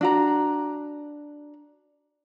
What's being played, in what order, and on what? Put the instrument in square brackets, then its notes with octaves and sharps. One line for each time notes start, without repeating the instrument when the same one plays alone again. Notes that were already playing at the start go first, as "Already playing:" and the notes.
[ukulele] D4 F#4 A#5